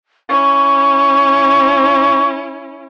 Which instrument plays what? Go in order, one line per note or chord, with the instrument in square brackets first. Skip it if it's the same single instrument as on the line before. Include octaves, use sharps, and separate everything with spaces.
[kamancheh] C#4 E4 [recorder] C#6